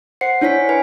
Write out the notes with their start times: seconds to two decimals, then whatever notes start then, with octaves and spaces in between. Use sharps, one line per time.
0.21 C5 F#5 C7 C#7
0.41 D4 E4 C#5 G#5 B6
0.69 B4 G#5